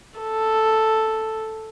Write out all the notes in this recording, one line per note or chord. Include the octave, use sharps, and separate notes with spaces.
A4